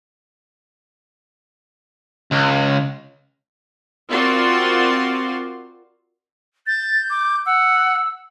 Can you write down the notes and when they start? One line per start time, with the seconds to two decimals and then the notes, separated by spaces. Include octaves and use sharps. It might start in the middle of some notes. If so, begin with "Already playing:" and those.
2.32 C#2
4.09 C4 F4 F#4 A#4 D5 C6
6.67 G6 A6
7.10 D6
7.46 F#5 E6